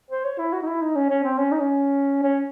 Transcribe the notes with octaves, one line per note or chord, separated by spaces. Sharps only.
C5
C#5
E4
F#4
D#4
E4
D#4
C#4
C#4
C4
C#4
D#4
C#4
C#4